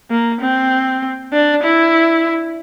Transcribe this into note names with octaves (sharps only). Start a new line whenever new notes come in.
A#3
C4
D4
E4